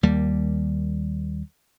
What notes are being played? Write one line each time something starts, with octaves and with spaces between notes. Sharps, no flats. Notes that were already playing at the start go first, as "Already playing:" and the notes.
D#2 G3 A#3